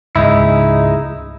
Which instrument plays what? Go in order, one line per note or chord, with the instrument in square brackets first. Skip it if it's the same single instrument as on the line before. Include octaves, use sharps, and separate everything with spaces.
[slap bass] C#2 G#2 C#3 [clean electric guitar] G#3 D#4 E4